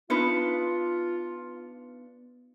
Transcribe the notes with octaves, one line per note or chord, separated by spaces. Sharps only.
B3 D4 D#4 F4 B4 C#7